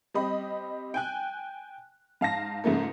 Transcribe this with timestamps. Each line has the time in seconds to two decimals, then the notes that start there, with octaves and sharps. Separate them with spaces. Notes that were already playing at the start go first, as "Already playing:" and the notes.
0.14 G3 C4 D#5 B5
0.94 G5 G#5 F#6
2.21 G#2 F5 A5 A#6
2.64 G#2 C#3 F3 A3 A#3